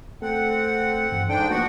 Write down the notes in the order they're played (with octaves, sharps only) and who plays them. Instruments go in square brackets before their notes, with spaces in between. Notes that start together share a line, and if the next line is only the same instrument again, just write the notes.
[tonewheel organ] A3 A4 [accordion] C4 F#5
[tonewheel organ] G2 E3
[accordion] G#2 D4 G5 [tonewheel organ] A4 D5
[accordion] F3 F#4 F#5 [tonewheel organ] A3 A#3 B4